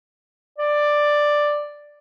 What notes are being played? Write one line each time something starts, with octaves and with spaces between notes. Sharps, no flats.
D5